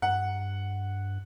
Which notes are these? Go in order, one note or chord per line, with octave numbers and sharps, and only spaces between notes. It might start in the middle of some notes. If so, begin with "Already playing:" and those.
G2 F#5